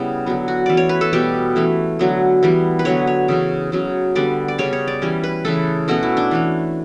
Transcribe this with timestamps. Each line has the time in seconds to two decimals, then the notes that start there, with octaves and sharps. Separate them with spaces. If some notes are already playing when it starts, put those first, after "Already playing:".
Already playing: C#3 G3 B3 E4
0.26 D3 F#3 B3
0.48 F#4
0.66 E3 A3 C#4 D5
0.77 C#5
0.89 B4
1.01 A4
1.13 B2 G3 B3 G4
1.56 E3 A3 C#4
1.99 D3 F#3 B3
2.43 E3 G3 B3
2.79 B4
2.85 D3 F#3 B3 C#5
3.07 C#5
3.28 C#3 E3 A3 C#4
3.72 C#3 F#3 C#4
4.15 D3 G3 B3 D5
4.48 D5
4.58 C#3 G3 C#4 C#5
4.73 C#5
4.88 D5
5.02 E3 G3 C#4
5.24 B4
5.45 C#3 E3 A3 A4
5.88 B2 A3 C#4 F#4
6.03 E4
6.17 D4
6.31 E3 A3 C#4